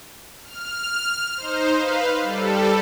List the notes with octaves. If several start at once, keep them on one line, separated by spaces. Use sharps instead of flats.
F6
D#4 C5
B4 F5
G3 A4